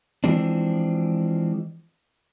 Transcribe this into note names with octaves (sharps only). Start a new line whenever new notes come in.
E3 F3 G#3 C4 D4